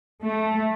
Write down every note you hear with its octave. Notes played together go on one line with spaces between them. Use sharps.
A3